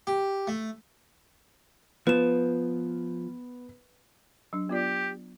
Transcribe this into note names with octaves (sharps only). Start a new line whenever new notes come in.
G4
A3
F3 B3 B4 E7
F#3 D4
B3 F4 G4 D5